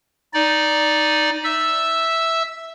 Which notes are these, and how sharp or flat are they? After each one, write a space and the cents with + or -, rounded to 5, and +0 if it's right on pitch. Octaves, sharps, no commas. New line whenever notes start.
D#4 +0 D5 +0
E5 -5 E6 +0